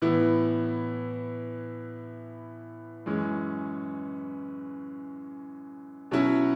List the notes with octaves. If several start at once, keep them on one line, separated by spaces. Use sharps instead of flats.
A2 E3 B3 E4
F#2 E3 G#3 C#4
B2 F#3 C#4 E4